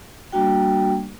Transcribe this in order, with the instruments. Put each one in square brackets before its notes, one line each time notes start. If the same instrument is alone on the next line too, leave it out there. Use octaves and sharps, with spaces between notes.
[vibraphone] G3 A#3 D4 F#4 G5